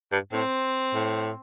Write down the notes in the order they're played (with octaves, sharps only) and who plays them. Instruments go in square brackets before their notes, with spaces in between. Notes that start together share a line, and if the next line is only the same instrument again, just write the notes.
[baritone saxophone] G2
[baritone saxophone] A2 [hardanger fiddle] C4
[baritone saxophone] A2